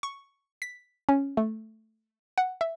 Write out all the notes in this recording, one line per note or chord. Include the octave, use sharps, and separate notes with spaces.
C#6
B6
C#4
A3
F#5
E5